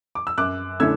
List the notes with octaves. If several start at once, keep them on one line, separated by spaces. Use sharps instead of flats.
D6
E6
F#2 D6 F#6
D3 A3 C#4 E4 E6 G#6